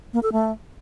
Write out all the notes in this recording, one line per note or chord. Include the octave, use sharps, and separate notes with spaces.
A#3
A4
A3